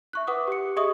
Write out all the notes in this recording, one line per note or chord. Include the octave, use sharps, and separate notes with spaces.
E5 C#6 F#6
B4 F#5 D6 D#6
G4 C#7
G4 G#4 D#5 E5 C#6 D#6